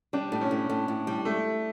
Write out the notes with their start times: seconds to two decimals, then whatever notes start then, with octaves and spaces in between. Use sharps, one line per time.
0.13 G3 D4
0.32 A2
0.41 C#4
0.51 A2
0.70 A2
0.88 A2
1.07 G3
1.25 A3